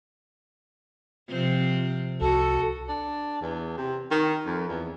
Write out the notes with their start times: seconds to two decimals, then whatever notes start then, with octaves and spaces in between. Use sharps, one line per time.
1.29 C3 F3 C4
2.21 C2 F#4 A4
2.89 D4
3.41 E2
3.77 C3
4.11 D#3
4.46 F2
4.69 E2